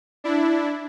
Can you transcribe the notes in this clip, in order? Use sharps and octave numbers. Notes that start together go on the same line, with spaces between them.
D4 E4